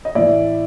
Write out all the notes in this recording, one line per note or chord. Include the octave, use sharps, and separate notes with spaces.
D#5
A2 E3 D5 E5